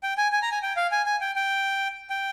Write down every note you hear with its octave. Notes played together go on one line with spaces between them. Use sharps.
G5
G#5
G#5
A#5
G#5
G5
F5
G#5
G#5
G5
G5
G5